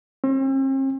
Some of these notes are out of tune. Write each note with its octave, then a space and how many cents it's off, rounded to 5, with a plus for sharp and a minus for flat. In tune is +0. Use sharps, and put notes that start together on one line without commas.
C4 +45